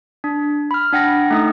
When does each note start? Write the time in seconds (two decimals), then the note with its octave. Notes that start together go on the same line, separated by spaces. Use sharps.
0.24 D4
0.71 B5 F6
0.93 D4 F#5 G5 A#6
1.31 A3 D#4 D#6